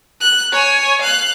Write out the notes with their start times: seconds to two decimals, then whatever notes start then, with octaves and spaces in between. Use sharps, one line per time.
0.21 F#6
0.52 C#5 G#5
1.01 F5 F#6